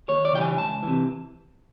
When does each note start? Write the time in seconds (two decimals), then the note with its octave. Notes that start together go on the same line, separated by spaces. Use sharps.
0.08 D#2 C#5
0.25 D5
0.33 C#3 E3 G3 G5
0.41 G#5
0.57 C#2 A5
0.83 C3 E3